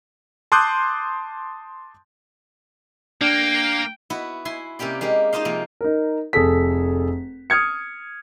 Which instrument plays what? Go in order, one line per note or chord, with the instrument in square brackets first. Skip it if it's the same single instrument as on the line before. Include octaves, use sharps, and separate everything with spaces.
[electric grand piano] A5 C6 D6 D#6 F#6 G6
[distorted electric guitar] A#3 [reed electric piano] D4 [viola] G5
[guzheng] B3 E4 F#4
E4 G#5 C6
C3 A#3 C#4 G4 D5
G#3 A#3 G4
D#4 F4 C5 D#5 F5
C3 F3 A#3
[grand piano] D#4 A#4
F1 G#4 A4 B6
D#6 F6 G#6 C#7